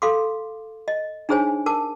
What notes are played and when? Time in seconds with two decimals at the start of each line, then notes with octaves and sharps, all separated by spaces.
0.02 A4 F5 C6 D6
0.88 D#5
1.29 D4 D#4 G#4 C5 C#5 G#5
1.66 A#4 A5 D6